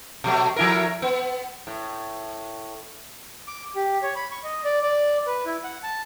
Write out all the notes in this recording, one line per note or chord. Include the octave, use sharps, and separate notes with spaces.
B2 F#3 A3
F3 E4 A#4
B3
A2
D6
G4
C#5
B5
C#6
D#5
D5
D5
B4
E4
F#5
A5